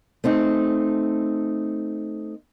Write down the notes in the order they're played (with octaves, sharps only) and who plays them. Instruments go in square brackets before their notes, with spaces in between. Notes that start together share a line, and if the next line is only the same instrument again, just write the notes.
[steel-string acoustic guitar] A3 C4 D#4